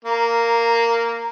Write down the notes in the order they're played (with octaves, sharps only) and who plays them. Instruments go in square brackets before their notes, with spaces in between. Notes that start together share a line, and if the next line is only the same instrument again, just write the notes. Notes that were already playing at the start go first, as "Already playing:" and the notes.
[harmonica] A#3 [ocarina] A#5